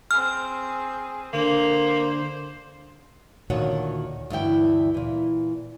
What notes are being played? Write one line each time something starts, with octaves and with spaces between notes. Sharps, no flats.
C4 G#4 F6
D3 A#3 C5
D2 A#2 D#3 F#4 C#5 F#5
D2 G2 E3 E4 G5
A#2 E3